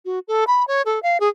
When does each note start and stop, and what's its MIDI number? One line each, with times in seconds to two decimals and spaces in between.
0.05 0.19 66
0.28 0.44 69
0.47 0.66 83
0.67 0.82 73
0.86 1.02 69
1.03 1.18 77
1.20 1.29 68